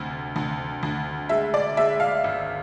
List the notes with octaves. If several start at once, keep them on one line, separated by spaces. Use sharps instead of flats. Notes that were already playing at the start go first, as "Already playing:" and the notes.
Already playing: D2 C3
D2
D2
G#3 E5
D5
G#3 E5
F5
G#1